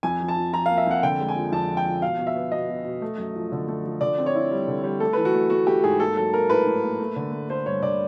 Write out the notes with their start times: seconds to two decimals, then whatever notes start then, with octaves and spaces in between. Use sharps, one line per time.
0.03 F2 G#5
0.20 F3
0.29 A5
0.36 F3
0.53 F3 A#5
0.66 A#3 F5
0.78 E5
0.87 F2 F#5
1.03 D3 G5
1.20 G#3
1.29 G#5
1.36 F3
1.52 F2 A5
1.69 F3
1.77 G5
1.86 F3
2.02 B2 F5
2.18 B2
2.27 E5
2.36 B3
2.52 B2 D#5
2.69 B2
2.85 B2
3.02 A3
3.18 F#2
3.36 F3
3.52 D3
3.68 A3
3.85 F3
4.01 D3 D5
4.19 C4
4.26 C#5
4.35 E4
4.51 G3
4.68 D3
4.84 G3
5.00 A3 A4
5.13 E3 B4
5.25 F#4
5.34 A3
5.50 A3 F#4
5.67 A3 G4
5.84 G#2 G#4
6.00 A#3 A4
6.16 F#3 A4
6.33 A#3 A#4
6.50 A2 B4
6.66 A2
6.83 A#3
7.00 A3
7.16 D3
7.32 A3
7.49 A3 C5
7.66 G2 C#5
7.83 D3 D5